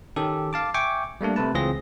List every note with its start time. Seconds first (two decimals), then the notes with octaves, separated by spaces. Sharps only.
0.16 D#3 C#4 G4 A4
0.53 F5 A5 D6
0.74 E5 G5 G#5 C#6 D6
1.21 G3 A3 A#3 D4
1.36 C3 A3 B4 A5
1.54 C#2 E3 C4 F4 G#4 A#6